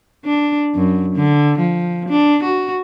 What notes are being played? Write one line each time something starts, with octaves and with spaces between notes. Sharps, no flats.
D4
F#2
D3
F3
D4
F#4